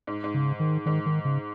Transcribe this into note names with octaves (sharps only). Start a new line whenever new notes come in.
G#2
G#2
C#3
D#3
G#2 D#3
D#3
C#3